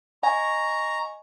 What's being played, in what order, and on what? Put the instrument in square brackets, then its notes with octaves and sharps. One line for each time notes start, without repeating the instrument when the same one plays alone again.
[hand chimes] D#5 F#5 G#5 [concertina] A#5 [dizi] C#6